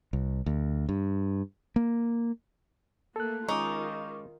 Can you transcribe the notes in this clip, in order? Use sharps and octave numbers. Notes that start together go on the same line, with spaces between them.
C2
D2
G2
A#3
A3 A#3 A4 F#6
D#3 G#3 C#4 D#4 F4 C#6 D6